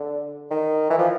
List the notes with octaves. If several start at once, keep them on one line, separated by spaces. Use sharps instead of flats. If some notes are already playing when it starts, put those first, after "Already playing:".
Already playing: D3
D#3
E3
F3